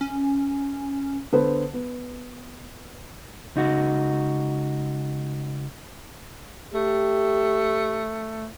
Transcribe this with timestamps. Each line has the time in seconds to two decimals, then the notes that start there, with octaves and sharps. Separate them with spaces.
0.01 C#4
1.33 D3 B3 A4 B4 C5
1.73 B3
3.55 C#2 D#4 F#4
6.74 A3 G4